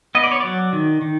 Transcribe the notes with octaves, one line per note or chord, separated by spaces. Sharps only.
B3 D#5
D5
C#5
F#3 D5
D#3
D#3